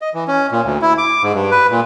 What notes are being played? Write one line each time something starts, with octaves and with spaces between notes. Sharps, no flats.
D#5
E3
C#4
A#2
D2
E4
D6
G#2
G2
B4
A#2